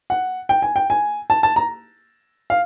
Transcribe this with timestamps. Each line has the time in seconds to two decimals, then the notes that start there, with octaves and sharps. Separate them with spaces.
0.10 F#5
0.49 G5
0.62 G#5
0.76 G5
0.90 G#5
1.30 A5
1.43 A5
1.56 A#5
2.50 F5